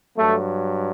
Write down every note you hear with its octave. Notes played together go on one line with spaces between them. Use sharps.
G2 F#3 A3